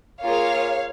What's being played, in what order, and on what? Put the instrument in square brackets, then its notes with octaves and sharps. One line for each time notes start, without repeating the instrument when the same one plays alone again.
[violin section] A#3 F4 G#4 C#5 F5